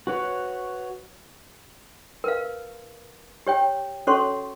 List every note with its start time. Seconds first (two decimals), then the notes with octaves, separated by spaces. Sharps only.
0.07 F#4 B4 C#5
2.24 A#4 B4 F5
3.47 G4 C#5 G5
4.07 C#4 F#4 A4 C#5 C6 C#6